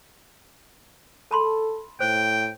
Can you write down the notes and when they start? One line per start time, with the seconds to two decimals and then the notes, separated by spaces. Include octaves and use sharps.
1.31 A4 A5 B5 C6
2.00 A2 C5 G5